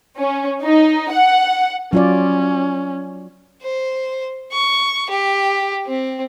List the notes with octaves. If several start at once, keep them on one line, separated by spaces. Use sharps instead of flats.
C#4
D#4
F#5
F#3 C#4 F4 D5
C5
C#6
G4
C4